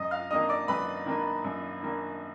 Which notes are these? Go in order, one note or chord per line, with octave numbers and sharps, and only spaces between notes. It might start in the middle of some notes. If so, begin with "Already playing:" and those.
Already playing: F#2 D#5 D#6
F5 F6
D#3 A#3 D4 D#5 D#6
D5 D6
F#2 B4 B5
D#3 A#3 D4
F#2
D#3 A#3 D4